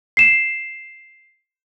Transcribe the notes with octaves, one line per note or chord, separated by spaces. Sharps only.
C7 E7